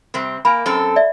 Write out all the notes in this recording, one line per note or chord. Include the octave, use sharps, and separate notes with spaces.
C3 G3 C4
A#3 G#5 B5
F#2 C4 A4
D5 E5